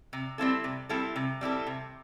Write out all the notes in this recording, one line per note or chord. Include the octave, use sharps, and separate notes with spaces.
C3
G3 C4 E4 A4
C3
G3 C4 E4 A4
C3
G3 C4 E4 A4
C3